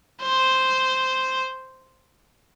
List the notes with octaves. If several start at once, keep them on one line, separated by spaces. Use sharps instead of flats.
C5